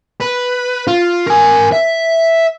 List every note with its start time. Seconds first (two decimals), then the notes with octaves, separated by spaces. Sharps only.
0.21 B4
0.87 F4
1.27 A#4 G#5
1.72 E5